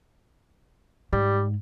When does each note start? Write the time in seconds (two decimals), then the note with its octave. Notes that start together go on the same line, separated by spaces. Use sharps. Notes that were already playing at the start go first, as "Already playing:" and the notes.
1.13 G#2 G3